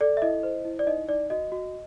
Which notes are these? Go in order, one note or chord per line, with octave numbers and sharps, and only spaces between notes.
A4 D5
E5
E4 D#5
C5
E4
D5
D#4 D#5
D#4 D5
F#4 D#5
F#4